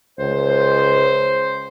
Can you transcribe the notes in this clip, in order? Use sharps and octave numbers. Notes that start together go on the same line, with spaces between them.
C#2 C5